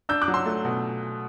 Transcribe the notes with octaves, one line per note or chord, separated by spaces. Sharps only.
D4 E6 G6
D6 F#6
F#3
C6 E6
A3
B2